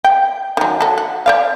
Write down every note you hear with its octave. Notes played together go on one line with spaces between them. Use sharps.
G5
D#3 F#3
F#4 A4
F#5
C5 D5 F5